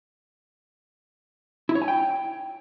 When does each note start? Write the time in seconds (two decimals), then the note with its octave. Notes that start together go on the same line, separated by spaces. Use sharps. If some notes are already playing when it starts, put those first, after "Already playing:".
1.69 E4
1.75 C#5
1.82 G#5
1.88 G5